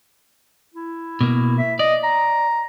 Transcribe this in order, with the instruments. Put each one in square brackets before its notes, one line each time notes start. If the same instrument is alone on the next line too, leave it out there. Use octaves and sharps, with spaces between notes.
[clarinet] E4
[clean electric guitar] B2 A#3
[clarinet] E5
[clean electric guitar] D5 [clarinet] D#5
[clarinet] A#5